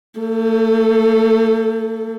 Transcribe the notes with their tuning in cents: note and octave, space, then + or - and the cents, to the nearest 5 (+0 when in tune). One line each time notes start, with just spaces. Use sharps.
A3 +45 A4 +0